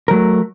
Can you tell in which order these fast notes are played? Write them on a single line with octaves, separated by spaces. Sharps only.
A#4 F#3 A3